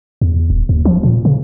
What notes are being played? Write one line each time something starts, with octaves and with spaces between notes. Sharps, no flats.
E2
D#1
D#2
F3
A#2
C#3